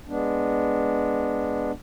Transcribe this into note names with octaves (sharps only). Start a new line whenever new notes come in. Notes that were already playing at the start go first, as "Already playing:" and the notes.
G#3 B3 D4